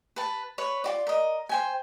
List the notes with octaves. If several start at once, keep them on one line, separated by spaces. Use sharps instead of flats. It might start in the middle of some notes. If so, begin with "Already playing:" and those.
B4 A5
B4 C#5
F4 F#4 D5
A#4 D#5
C5 G5 G#5